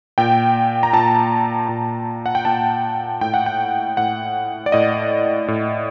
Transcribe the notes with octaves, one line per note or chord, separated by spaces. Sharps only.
A#2 G5
A#5
A#2 A5
A#2
F#5
G5
A#2 A5
A2 G5
F#5
G5
A2 F#5
D5
A2 D#5
A2